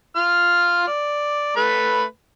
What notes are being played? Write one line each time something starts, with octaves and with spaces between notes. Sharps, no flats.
F4 F6
D5
A3 B4 B5